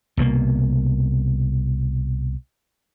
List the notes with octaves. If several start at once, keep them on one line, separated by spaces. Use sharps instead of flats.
C2 B2 F#3 A#3